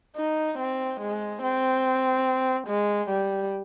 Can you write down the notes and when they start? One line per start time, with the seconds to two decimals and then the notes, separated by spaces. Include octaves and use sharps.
0.16 D#4
0.58 C4
1.00 G#3
1.42 C4
2.67 G#3
3.09 G3